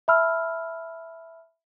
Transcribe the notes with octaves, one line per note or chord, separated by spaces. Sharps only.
E5 A5 B5 E6 F6